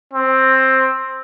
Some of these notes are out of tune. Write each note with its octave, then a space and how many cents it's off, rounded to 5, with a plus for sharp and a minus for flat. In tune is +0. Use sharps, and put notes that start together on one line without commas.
C4 +10